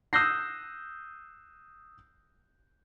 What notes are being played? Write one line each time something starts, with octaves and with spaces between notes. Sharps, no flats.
D#6 E6 F#6 G6 A#6 C7